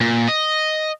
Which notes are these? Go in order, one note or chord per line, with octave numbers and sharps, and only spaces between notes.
A#2
D#5